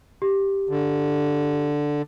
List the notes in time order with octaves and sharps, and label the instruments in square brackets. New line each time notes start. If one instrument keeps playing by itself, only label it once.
[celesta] G4
[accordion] D3